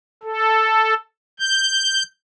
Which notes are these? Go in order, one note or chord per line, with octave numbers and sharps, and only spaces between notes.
A4
G6